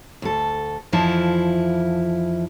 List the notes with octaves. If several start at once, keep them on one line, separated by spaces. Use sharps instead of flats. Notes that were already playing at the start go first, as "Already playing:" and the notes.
D2 A4
F2 E3 F3 E4 F4 A5